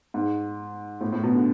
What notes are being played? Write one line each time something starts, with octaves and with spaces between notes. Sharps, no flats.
G#2
A2
A2
B2
D3